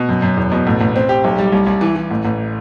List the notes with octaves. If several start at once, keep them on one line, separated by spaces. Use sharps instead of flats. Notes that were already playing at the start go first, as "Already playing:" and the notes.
Already playing: B2
F#2
F#2
E2
B2
A1
A1
C4
G4
B1
G3
C2
C2
E3
E3
A1
A1